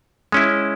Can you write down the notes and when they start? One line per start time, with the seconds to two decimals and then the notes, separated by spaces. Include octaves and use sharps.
0.32 G#3 C#4 E4